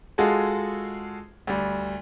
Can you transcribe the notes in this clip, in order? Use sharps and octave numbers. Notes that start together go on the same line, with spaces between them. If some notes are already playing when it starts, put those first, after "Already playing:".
G#3 F4 F#4 G#4 A4
D2 G3